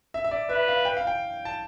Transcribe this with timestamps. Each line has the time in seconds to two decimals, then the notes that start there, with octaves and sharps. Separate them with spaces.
0.14 E5
0.24 E5
0.31 D5
0.49 B4 E5
0.68 F5
0.85 G5
0.97 F5
1.07 G5
1.45 A5